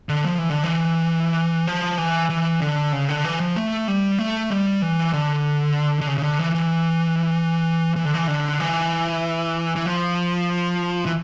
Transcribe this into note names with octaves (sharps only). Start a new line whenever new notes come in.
D3
F3
E3
D3
E3
F3
E3
E3
D3
C#3
D3
E3
F3
A3
G3
A3
G3
E3
D3
D3
C#3
C#3
D3
E3
E3
E3
D3
E3
D3
E3
E3
F3
E3